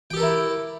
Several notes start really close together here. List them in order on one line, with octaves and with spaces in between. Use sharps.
G5 G4 A4 A#4 E4